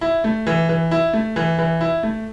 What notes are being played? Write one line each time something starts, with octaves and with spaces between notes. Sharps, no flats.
E4
A3
E3
E3
E4
A3
E3
E3
E4
A3